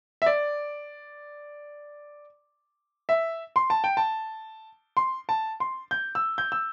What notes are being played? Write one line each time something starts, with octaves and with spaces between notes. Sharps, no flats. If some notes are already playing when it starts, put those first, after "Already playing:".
E5
D5
E5
C6
A5
G5
A5
C6
A5
C6
G6
E6
G6
E6